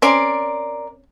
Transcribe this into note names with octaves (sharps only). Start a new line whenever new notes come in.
C4 C#4 A#4 D5 C6